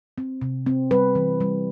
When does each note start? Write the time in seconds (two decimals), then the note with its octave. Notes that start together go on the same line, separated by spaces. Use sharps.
0.18 C4
0.42 C3
0.66 C4
0.91 G3 B4
1.15 E3
1.41 G3